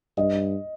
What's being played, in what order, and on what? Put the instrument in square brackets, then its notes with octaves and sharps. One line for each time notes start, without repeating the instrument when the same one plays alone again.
[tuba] G2 [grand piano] D#5